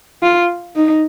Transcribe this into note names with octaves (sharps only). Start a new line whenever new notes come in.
F4
D#4